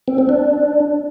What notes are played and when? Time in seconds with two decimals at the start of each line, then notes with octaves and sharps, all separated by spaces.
0.08 C4
0.18 C4
0.29 D4